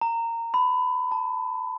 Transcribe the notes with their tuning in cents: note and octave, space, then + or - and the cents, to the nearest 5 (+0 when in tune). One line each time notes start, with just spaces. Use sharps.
A#5 -15
B5 +20
A5 +20